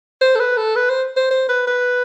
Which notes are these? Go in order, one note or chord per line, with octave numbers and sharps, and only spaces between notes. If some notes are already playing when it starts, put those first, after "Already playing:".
C5
A4
B4
A4
B4
C5
C5
C5
B4
B4